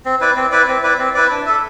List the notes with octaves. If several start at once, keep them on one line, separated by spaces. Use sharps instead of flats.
C4
E4 B4 D5
C4
E4 B4 D5
C4
E4 B4 D5
C4
E4 B4 D5
D4
A4 E5